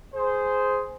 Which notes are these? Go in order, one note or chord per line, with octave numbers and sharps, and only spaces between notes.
G#4 C5